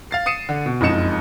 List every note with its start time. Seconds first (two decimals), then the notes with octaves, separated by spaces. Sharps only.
0.11 F5 A6 C7
0.26 D#6 C7 C#7 D#7 E7
0.49 D3
0.66 B2
0.81 F#1 F2 G#3 D#4 C#7 E7